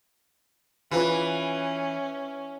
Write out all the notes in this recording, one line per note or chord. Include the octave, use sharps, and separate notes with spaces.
E3 C#4 F4 B4